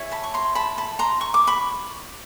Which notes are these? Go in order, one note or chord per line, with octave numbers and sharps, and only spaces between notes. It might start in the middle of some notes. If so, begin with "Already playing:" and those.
Already playing: E4 G#4 C#5
A5 B5
C#6
A#5 C6
A5 B5
A5 B5
A#5 C6
C#6
D6
B5 C#6